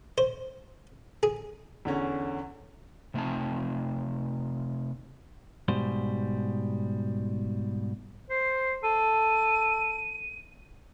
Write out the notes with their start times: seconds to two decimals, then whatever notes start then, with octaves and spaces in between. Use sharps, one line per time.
0.18 C5
1.23 G#4
1.85 E2 D3 C#4
3.14 C3 A3 C4 D#4 A5
5.68 G#2 B2 G3 C5
8.30 C5 C7
8.83 A4 D#7